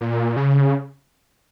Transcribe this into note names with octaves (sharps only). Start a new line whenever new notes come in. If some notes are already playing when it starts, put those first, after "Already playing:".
A#2
C#3